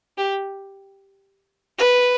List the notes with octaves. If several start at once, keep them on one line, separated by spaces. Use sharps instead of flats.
G4
B4